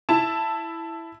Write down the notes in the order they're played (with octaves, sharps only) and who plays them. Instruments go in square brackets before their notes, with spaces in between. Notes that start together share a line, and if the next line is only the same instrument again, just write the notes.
[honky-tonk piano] E4 A5